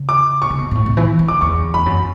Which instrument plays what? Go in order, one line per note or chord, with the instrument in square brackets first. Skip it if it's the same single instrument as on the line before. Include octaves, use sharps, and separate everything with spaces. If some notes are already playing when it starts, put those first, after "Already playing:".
Already playing: [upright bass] C#3
[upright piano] D6
[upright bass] B2 [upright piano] C#6
[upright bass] C#3
B2
G#2
A2
B2
E3
E3
[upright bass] D3 [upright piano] D6
[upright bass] E2 [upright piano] C#6
[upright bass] E2 [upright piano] B5
[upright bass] F#2